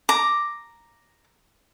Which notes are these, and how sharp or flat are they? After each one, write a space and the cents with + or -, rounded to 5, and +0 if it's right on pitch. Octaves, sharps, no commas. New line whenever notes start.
A#5 +0 D6 +0